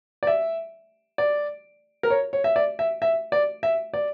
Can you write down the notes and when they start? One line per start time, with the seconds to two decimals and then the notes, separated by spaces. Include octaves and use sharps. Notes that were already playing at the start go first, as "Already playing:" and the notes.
0.23 D5
0.27 E5
1.18 D5
2.03 A#4
2.10 C#5
2.33 C#5
2.44 E5
2.56 D5
2.79 E5
3.02 E5
3.32 D5
3.63 E5
3.94 D5